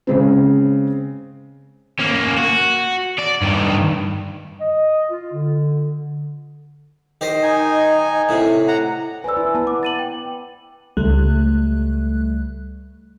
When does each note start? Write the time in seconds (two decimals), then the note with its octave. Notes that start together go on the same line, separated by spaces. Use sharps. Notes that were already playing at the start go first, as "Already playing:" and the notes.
0.07 C#3 G#3 C4
2.00 A#3 C#4
2.38 F#4
3.18 D5
3.42 G2 D#3
4.60 D#5
5.10 F4
5.33 D3
7.21 D#3 G4 C5 D#5
7.43 D#4 G#5
8.29 A2 C3
8.68 F#5 A#5
9.24 B4 C5 D5 G#5 E6
9.37 E4
9.55 B3 A5
9.67 D6
9.83 A6 D#7 F#7
9.99 G5
10.97 C#2 G3 A3 F#6